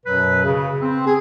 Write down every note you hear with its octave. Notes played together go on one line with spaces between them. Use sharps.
F#2 B2 F#3 B4
C#3
C4
G#4